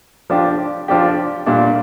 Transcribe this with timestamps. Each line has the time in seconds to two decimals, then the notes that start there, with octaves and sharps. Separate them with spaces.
0.30 F3 D4 G4
0.88 F3 D4 G4
1.46 A#2 G3 D4